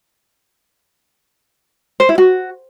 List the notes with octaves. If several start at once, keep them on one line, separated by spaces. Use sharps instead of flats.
C5
E4
F#4